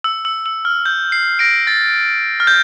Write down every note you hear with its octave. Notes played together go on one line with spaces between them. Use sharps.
E6
E6
E6
F6
G6
C7
A#6 D7
A6
F6
G6